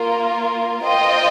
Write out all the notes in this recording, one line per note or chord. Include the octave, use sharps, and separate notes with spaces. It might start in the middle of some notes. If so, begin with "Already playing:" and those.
Already playing: A#3 F4 A#4
F4 C5 D#5 G5